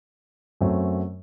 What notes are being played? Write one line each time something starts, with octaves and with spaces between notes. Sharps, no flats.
F#2 F#3 A3 C4